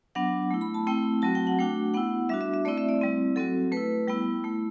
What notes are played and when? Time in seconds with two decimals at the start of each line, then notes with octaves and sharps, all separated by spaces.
0.15 F#3 B3 D4 F#5
0.51 A3 E4
0.61 B5
0.74 A5
0.87 A3 C4 E4 G5
1.22 F#3 C4 F#4 A5
1.35 G5
1.47 F#5
1.59 A3 D4 F#4 G5
1.94 B3 E4 F#5
2.29 G3 D4 F#4 E5
2.41 E5
2.54 E5
2.65 A3 C4 E4 D5
2.78 E5
2.89 D5
3.01 G3 C4 E4
3.36 F#3 C4 F#4 A4
3.72 A3 E4 B4
4.07 G3 B3 E4 G5
4.44 A3 E4